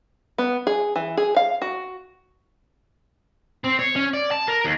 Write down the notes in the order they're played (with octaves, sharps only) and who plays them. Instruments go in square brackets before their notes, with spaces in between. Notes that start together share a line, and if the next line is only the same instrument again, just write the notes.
[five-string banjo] B3
G#4
E3
G#4
F5
F#4
[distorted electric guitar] C4
C#5
C#4
D5
A5
A#4
D#2